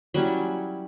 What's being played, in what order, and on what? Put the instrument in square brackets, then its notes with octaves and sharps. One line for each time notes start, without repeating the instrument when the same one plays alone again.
[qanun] F#3 G3 C#4 E4